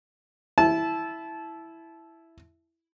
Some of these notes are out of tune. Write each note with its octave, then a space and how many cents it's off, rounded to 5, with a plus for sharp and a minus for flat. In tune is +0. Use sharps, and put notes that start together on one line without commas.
E4 +0 A5 -20